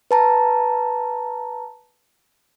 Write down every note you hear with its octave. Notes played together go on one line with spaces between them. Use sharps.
B4 A5 A#5